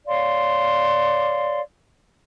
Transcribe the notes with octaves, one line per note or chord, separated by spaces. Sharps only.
C#5 D5 F5 C6